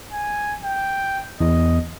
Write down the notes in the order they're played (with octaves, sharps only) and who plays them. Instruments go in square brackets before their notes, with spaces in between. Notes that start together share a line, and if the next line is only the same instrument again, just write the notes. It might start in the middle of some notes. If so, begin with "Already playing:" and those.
[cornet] G#5
G5
[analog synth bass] E2 [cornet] D#5